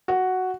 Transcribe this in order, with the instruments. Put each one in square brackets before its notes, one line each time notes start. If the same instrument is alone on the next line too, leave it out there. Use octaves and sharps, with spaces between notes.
[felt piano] F#4